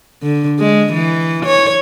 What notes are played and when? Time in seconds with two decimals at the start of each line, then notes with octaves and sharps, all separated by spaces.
0.23 D3
0.59 G#3
0.93 E3
1.46 C#5